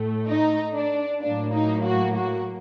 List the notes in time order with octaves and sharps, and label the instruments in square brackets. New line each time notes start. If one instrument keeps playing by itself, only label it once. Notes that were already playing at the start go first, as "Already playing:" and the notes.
Already playing: [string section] A2 A3
D#4
D4
A2 F#3 A#3 D4
D#4
F#4
F#4